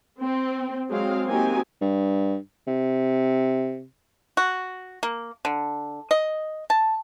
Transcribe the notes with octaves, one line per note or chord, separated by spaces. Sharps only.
C4
F#3 G#3 C4 G#4 F5
A#3 C4 D#4 F#4 G4 G#5
G2
C3
F#4
A#3
D3
D#5
A5